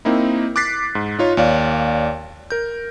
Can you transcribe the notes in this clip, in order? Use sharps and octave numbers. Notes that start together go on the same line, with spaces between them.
A#3 C4 D#4 E4
D6 F#6 A6 B6 C7
G#2
D#4 F4 C#5
D#2 C#5 D5 F5
A#4 G6